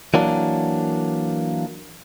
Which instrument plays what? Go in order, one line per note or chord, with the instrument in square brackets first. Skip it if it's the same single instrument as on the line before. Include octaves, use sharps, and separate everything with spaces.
[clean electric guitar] E3 F#3 A#3 D4